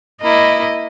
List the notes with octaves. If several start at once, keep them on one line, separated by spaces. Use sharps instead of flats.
A#3 E4 D#5